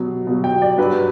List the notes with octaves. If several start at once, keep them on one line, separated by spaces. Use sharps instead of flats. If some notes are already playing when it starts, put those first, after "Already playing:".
Already playing: B2 F#3
B2 F#3
G5
D5
G2 F#3 B4